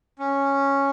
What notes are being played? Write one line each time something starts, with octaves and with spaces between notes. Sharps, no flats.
C#4